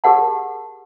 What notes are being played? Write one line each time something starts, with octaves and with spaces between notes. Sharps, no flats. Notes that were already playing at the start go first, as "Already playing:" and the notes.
G4 G#4 A#4 F#5 A5